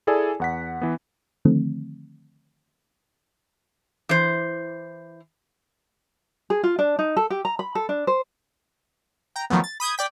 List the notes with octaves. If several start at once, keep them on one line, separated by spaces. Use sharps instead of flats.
E4 G#4 A4 D5 G#5
E2 F#5 B6
E3 B3
D3 D#3 F3 A3 C4
E3 C5
G#4
F4
D4
D#4
A4
G4
A#5
B5
A4
D4
C5
G5 A#5
D#3 F3 F#3 A3 B3
A6
B5 D#6 G6 G#6
D5 G5 B6